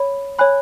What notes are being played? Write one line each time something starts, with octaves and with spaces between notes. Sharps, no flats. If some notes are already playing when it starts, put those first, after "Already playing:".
Already playing: C#5 B5
C#5 G#5 B5 F#6